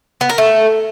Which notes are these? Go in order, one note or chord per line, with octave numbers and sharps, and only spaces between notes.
B3
A#4
A3